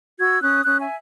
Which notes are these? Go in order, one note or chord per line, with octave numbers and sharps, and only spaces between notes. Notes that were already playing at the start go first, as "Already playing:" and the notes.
F#4 E6 G#6
C#4 D#6 F#6
C#4 D#6 F#6
E5 G#5